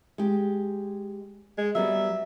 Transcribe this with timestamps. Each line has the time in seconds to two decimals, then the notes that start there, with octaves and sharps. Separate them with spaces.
0.18 G#3 G4
1.58 G#3
1.75 F#3 G3 B3 E5